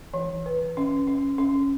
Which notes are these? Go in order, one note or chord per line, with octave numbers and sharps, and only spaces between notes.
E3
B4
C#4
C#4
C#4